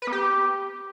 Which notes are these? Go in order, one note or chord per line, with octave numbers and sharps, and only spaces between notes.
B4
B3
G4